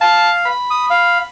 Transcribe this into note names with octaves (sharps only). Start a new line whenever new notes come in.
F5 A5
B5
D#6
F5